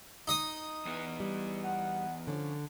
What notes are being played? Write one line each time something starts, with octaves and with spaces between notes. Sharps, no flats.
D#4 D#5 D#6
E2 B3
G3
F#5
D3 F3 C#4